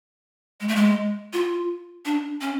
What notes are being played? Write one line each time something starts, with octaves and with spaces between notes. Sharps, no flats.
G#3
A3
G#3
F4
D4
C#4